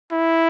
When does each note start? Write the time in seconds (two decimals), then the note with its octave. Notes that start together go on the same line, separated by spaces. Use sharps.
0.12 E4